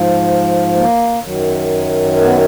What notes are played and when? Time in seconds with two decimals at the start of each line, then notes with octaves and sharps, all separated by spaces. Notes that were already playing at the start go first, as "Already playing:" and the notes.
Already playing: G#2 F3
0.75 A#3
1.23 F#2 D#3 F#3
2.22 B3